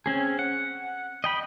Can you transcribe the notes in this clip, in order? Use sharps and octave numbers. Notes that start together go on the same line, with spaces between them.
C4 C#4 G#4
F#5
D#5 G5 B5